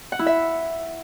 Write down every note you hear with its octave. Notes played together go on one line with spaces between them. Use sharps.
F#5
E4
E5